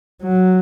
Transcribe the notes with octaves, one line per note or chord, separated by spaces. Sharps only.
F#3